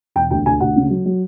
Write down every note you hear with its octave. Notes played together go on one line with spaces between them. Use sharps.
E1 G5
D2 G5
D2 G#5
D2 F#5
C#3
F#3
F#3